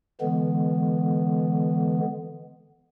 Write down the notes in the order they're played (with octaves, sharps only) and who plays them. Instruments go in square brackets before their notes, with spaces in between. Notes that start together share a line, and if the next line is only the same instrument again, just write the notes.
[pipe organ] D3 E3 G#3 B3